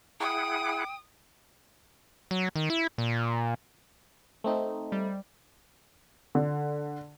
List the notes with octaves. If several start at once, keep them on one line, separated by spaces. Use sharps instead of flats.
E4 G#4 F#5 G5 D#6
F#3
D#3
E4
A#2
A3 C4 D#4
G3
D3